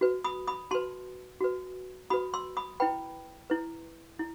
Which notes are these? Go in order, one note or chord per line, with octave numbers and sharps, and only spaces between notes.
F#4 B4
B5 D#6
B5 D#6
F#4 B4 A5 C6
F#4 B4
F#4 B4 B5 D#6
C6 E6
B5 D#6
E4 B4 G5 B5
E4 B4
E4